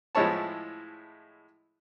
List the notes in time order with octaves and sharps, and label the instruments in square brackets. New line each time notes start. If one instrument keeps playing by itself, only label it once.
[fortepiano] A2 F3 G#3 E4 C#5 A5